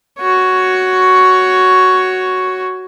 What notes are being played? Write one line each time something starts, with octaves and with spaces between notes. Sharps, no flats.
F#4 C#5